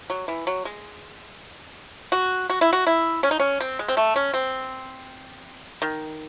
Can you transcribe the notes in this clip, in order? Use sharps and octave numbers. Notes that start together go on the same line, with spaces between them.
F#3
E3
F#3
G#3
F#4
F#4
E4
F#4
E4
C#4
D#4
C#4
C4
G#3
C4
A3
C#4
C4
D#3